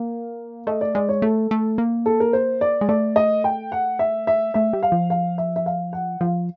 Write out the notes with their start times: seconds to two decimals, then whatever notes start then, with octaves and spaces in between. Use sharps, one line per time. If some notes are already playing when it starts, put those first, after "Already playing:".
Already playing: A#3 F5
0.67 A3 D#5
0.81 D5
0.95 G#3 D5
1.09 C#5
1.22 A3 A4
1.51 A3
1.78 A#3
2.06 A4
2.20 A#4
2.33 C5
2.61 D5
2.81 G#3
2.89 A3 D5
3.16 D#5
3.44 G5
3.72 F#5
3.99 E5
4.27 E5
4.54 A3 E5
4.73 G3
4.83 F5
4.92 F3
5.10 F5
5.38 E5
5.56 E5
5.66 F5
5.93 F#5
6.21 F3 F5